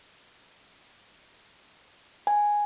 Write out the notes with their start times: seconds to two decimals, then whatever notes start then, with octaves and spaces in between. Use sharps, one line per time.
2.27 G#5